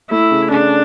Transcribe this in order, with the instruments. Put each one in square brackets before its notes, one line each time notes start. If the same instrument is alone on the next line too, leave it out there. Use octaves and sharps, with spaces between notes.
[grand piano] A3 [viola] E4
[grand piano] C#3
[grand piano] C#3 [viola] D4